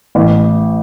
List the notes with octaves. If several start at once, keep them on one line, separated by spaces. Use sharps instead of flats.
A1